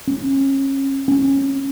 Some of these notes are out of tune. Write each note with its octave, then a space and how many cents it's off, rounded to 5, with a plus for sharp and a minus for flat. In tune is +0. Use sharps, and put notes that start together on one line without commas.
C#4 -30
C#4 -15